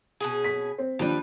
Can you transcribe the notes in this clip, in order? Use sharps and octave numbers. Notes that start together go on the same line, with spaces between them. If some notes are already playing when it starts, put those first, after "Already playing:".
B2 C#4 G#4
B6
C4
D#2 F3 G3 D4 B4